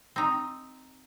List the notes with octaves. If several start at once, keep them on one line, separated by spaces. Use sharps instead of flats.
C4 D#4